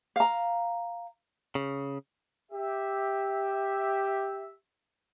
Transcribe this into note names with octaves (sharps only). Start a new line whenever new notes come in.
F5 A#5
C#3
G4 E5